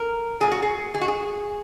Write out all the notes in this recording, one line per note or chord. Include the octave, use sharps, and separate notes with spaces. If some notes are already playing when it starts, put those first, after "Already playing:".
Already playing: A#4
A#2 F#3 G#4
F#4
G#4
F3 G#4
G#2 F#4
G#4